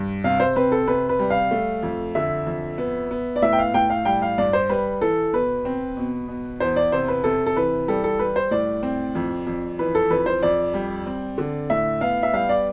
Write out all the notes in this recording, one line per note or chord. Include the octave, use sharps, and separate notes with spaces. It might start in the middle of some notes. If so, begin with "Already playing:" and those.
Already playing: G2
C3 F5
C5
C4 B4
A4
C3 B4
B4
G3
F5
A3
F2
D3 E5
F2
B3
B3
D5
A2 E5
G5
F5
A2 G5
F5
G3 G5
F5
G2 D5
C5
G3 B4
E3 A4
B2 B4
C4
B2
B2
E2 C5
D5
C3 C5
B4
C3 A4
A4
E3 B4
G3 A4
A4
G3 B4
C5
A2 D5
C4
F2
F2
E3 B4
A4
F2 B4
C5
F2 D5
G3
C4
D3
A2 E5
B3 F5
E5
G3 F5
D5